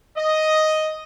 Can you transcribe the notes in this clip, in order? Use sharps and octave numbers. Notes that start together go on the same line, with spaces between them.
D#5